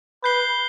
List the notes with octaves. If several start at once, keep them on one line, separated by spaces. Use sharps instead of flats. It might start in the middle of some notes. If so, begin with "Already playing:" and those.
B4 G6 C7 G7